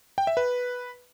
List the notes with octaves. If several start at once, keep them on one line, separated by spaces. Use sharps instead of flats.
G5
E5
B4